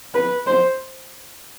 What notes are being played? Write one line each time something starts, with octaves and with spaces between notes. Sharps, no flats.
B4
C5